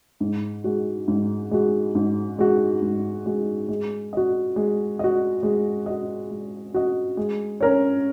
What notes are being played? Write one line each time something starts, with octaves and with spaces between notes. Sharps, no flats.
G#2
G#3 F#4
G#2
G#3 F#4
G#2
G#3 F#4
G#2
G#3 F#4
G#3
F#4 D#5
G#3
F#4 D#5
G#3
F#4 D#5
G#3
F#4 D#5
G#3
C#4 A#4 C#5